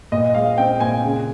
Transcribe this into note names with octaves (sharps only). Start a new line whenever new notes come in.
A#2 D#5
G#3 F5
C4 G5
A#2 G#5
C#3